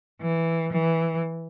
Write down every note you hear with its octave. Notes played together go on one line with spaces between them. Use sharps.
E3
E3